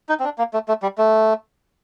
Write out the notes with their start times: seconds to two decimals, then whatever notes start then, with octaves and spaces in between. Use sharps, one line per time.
0.09 D#4
0.20 C4
0.24 D4
0.38 A#3
0.54 A3
0.68 A3
0.83 G3
0.98 A3